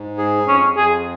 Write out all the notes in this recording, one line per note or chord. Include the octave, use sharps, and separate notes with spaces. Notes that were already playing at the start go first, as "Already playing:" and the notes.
Already playing: G#2
G#4
F2 C#4
F2 G#4